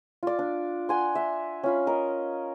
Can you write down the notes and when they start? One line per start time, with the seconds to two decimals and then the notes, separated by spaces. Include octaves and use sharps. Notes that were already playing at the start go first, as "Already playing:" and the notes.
0.23 F4 D5
0.39 D4
0.89 F#5 G#5 C6
1.15 E5
1.64 C#4 F4 B5
1.87 A#4 D#5